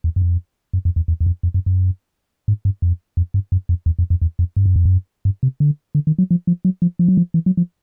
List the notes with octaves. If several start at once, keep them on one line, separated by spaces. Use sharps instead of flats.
E2
F#2
F2
F#2
F2
E2
E2
E2
F2
F2
F#2
F#2
G#2
G2
F2
F2
G2
F#2
F2
E2
F2
F2
E2
F2
G2
F#2
F2
F#2
G2
C3
D3
D3
D#3
F#3
F3
F3
F#3
F3
F3
F#3
F3
E3
F#3
F3